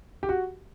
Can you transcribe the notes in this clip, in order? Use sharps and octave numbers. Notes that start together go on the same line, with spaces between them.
G4
F#4